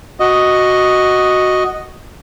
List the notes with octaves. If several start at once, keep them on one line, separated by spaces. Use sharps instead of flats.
F#4 D#5